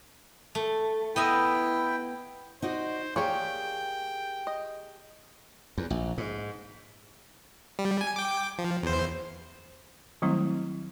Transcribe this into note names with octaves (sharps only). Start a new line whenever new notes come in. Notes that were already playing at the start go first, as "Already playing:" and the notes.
A3
B3 E4 D#5 E5 G5
D#4 F#4 C5 D5
A#3 G4 G#4 C#5 D5 G5
D#5
E2
A#1
G#2
G3
G#5
G5 D6
F3
E2 C5
D#3 F#3 G3 A3 C4 E4